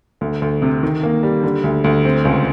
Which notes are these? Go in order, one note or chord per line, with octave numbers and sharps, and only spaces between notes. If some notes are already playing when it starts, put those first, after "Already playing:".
D2
D2
C3
D#3
A#3
G3
D3
D2
D2
C4
C#2